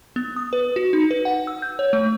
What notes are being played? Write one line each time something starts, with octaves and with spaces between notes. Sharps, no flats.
B3
D#6
B4
F#4
D#4
B4
F#5
E6
G6
C#5
A3